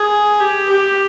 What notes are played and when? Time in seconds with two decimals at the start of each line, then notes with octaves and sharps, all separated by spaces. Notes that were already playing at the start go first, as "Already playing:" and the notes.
Already playing: G#4
0.40 G4
0.70 G4